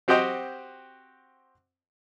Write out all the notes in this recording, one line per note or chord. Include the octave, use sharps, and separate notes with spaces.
C4 F#4 G4 C5 D#5 G5